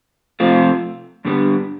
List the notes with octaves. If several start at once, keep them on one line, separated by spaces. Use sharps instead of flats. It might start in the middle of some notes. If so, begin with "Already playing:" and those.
C3 F3 A3 C4 F4
G2 D3 G3 B3